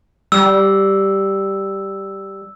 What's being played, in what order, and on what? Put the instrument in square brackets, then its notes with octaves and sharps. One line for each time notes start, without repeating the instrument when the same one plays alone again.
[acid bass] G3 [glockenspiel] E6